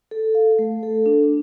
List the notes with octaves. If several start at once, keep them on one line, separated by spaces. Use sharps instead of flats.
A4
F5
A3
A4
D4